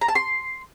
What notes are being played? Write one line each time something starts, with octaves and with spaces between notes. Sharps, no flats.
A#5
A5
C6